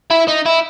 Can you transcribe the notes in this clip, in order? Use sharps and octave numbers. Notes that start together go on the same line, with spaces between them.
E4
D#4
E4